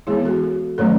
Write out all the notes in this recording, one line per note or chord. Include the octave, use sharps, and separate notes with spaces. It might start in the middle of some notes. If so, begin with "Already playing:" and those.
E3 G#3 B3 E4 G#4
F#4 A4
D#3 F#3 A3 C#4 A4 C#5